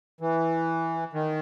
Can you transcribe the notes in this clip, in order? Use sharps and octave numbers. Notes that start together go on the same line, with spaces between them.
E3
D#3